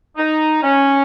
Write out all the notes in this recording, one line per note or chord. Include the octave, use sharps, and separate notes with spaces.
D#4
C#4